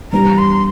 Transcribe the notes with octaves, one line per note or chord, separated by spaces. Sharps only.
G2 E3 G3 B3 A#5
C6